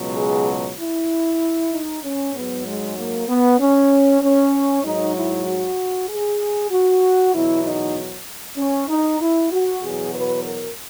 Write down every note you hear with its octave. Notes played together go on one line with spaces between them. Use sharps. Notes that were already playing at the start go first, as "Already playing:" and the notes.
Already playing: C#2 B2 F#3
G#4
E4
D#4
C#4
G#2 F#3 B3
G#3
A#3
B3
C#4
C#4
G#2 F#3 D#4
E4
F#4
G#4
F#4
E2 B2 F#3 E4
D#4
C#4
D#4
E4
F#4
E2 B2 F#3 G#4
B4
A#4